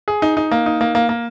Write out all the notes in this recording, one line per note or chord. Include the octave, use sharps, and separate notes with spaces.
G#4
D#4
D#4
A#3
D#4
A#3
A#3
A#3